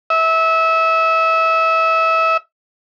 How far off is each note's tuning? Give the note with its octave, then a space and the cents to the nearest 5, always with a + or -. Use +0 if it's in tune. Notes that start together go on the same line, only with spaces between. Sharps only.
E5 -25